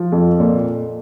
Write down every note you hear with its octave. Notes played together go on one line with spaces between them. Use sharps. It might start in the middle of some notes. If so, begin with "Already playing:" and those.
Already playing: F3
F2
A#2